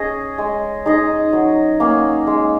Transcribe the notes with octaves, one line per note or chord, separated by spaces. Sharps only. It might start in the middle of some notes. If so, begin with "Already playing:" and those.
Already playing: C#4 G#4 D#5
G#3
D#4 G#4 D#5
F#3
A#3 C#4
G#3